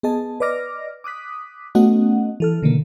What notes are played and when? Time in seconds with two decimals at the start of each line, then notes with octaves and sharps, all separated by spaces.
0.03 B3 G#4 D#5 A5
0.40 B4 D5 D#5 D6 F6 A#6
1.04 D6 D#6 F#6 B6
1.75 A3 B3 C#4 F#4 D#5 F#5
2.40 E3 A4 F6
2.62 B2 D3 D#3 A#3